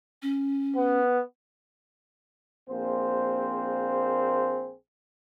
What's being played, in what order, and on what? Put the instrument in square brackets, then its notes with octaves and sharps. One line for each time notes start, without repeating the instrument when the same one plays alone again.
[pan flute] C#4
[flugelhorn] B3
[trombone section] A#1 A#3 C4 G#4 C5